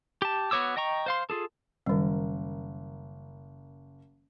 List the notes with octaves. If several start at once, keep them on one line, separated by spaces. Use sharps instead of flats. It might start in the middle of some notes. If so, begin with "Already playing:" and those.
G4 A5
B3 F#4 C#5 D6 E6
D#5 G5 A#5 C#6
C5 F5 C6
F4 G#4 A4
F#1 D#3 G3 A#4